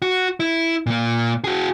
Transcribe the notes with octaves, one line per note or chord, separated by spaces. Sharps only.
F#4
E4
A#2 A#3
F#4 G#4